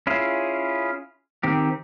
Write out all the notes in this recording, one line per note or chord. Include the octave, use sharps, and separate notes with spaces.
C#4 E4 F4 G#4
D#3 C4 G4